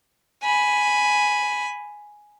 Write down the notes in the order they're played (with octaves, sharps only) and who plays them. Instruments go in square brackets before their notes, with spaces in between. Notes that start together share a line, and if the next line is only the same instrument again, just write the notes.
[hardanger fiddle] G#5 B5